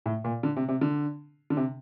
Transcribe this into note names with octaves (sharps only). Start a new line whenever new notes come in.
A2
A#2
D3
C3
C3
D3
D3
C3